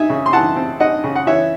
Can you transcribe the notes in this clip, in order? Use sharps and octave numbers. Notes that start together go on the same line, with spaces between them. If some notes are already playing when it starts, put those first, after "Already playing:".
Already playing: D#4 E5 G#5
C#3
C6
E3 F#5 A5
C4
D#4 D#5 F#5
C#3
F#5
E3 C#5 E5